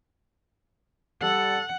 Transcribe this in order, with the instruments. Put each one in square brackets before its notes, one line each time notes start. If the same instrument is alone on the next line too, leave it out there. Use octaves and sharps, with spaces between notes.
[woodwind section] G3 A4 [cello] F#5